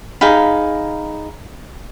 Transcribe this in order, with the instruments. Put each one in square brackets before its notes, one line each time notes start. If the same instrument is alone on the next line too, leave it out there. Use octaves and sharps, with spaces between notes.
[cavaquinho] D#4 G#4 F5 B5